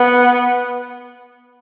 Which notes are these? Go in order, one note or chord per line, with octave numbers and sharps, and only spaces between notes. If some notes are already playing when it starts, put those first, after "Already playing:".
Already playing: B3